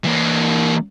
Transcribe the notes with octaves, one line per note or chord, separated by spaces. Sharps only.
E3 A#3